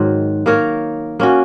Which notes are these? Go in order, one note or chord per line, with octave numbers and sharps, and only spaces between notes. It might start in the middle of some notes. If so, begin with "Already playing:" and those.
Already playing: G#2 D#3 F#3
A#3 D#4 A#4 C#5
A#3 C#4 F#4